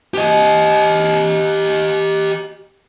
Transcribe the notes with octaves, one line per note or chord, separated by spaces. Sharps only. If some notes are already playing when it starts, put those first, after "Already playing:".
G4 D#5